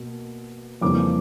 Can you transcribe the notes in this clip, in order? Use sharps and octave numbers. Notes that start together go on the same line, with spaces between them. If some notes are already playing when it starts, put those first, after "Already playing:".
Already playing: B2 A#3
F2 C#3 E3 G3 A#3 D6